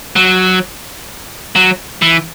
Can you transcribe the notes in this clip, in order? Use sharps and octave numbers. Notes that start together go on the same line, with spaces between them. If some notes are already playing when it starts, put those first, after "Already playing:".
F#3
F#3
E3